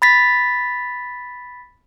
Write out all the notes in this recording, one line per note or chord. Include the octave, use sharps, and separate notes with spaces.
B5 A6 B6